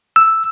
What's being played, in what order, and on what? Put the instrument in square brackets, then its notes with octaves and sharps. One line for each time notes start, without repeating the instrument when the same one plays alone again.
[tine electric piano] E6